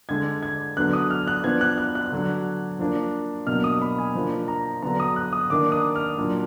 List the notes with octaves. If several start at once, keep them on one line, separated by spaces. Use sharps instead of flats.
D3 G#3 D4 G#6
G#6
D3 F#3 B3 D4 F#6
D#6
F6
F#6
F3 B3 D4 G#6
F#6
F#6
F#6
D3 F#3 D4
F3 A#3 D4
B2 F#3 A#3 D4 F6
D#6
B5
G#5
F3 A#3 D4
A#5
D3 F#3 B3 D4 A#5
D#6
F#6
D#6
D#3 A#3 D4 D6
D#6
F6
A#2 F#3 D4